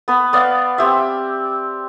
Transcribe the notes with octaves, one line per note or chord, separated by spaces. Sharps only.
B3 B4
B3 D5 F5
C4 G4 E5